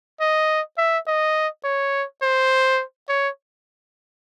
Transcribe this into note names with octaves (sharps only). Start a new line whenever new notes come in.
D#5
E5
D#5
C#5
C5
C#5